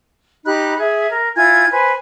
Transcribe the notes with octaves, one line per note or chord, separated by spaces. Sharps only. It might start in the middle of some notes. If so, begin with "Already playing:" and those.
D#4 G4 B5 F#6
G#4 E5
A#4
E4 F4 G#5 G#6
B4 C5 G#5